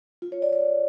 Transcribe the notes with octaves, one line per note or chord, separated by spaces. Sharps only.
F4
C#5
D5
D5